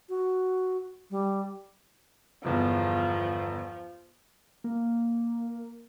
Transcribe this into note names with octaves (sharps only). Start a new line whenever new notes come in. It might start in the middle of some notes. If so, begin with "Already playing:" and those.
F#4
G3
G1 E2 F3
A#3